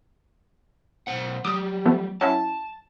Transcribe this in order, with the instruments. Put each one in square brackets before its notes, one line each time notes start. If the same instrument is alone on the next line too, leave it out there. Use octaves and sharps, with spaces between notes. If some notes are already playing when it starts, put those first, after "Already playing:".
[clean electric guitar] B1 C5 F#5
[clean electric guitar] F#3 G3 G4 [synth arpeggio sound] D6 D#6
[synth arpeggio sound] F3 A3 B3
[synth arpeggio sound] F#3 C#4 E4 [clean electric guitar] A5